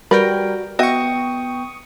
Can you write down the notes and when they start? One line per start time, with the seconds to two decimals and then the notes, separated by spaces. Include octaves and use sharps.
0.11 G3 F#4 A#4 B4 G5
0.79 B3 F#4 D#5 E5 G5 C#6 D#6